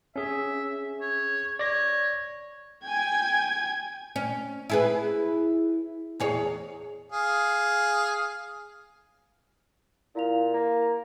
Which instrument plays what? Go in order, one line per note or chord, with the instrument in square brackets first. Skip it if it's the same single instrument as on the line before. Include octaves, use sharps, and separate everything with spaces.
[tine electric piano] C#4 G#4 [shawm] E5
[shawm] C#5
[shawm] C#5 [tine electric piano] D5 A#6
[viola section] G5 G#5 [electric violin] G#6
[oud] C#4
E4 G#4 B4
E2 G#4 C#5
[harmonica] G#4 F5
[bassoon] A#2 [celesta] E4 F5 F7
[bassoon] A#3